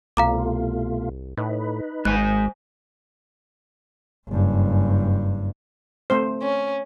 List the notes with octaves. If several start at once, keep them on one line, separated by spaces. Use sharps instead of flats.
C2 B2 A3 F4 F5 A#5 D6
A2 D#4 B4
G#1 G#3 C5 G#5 F#6
F#1 G2
A3 C4 C5
C#4